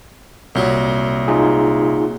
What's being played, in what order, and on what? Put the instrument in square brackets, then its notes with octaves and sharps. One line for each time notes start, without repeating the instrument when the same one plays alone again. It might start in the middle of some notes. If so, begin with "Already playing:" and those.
[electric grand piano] C2 [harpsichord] A#2 F#3
[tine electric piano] D#4 F4 G#4